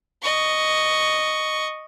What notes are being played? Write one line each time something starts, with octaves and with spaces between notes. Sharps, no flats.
D#5 C#6